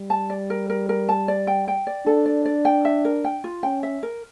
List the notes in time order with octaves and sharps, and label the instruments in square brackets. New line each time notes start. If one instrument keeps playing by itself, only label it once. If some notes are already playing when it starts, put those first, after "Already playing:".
Already playing: [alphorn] G3
[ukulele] A5
D5
A#4
A#4
A#4
A5
D5
G5
G5
D5
[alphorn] D4 [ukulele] A4
[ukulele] D5
D5
G5
E5
A#4
G5
F4
[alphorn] C#4 [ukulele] G5
[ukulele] E5
A#4